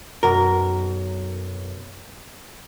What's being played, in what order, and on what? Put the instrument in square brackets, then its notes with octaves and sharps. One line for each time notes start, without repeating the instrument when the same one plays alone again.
[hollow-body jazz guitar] B1 F#2 A#4